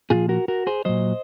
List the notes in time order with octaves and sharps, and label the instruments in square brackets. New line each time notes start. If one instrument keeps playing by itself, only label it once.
[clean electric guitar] A#2 F3 F4 G#4
F#4 A#4
F#4 A#4
G#4 C5
A#2 F#3 C5 D#5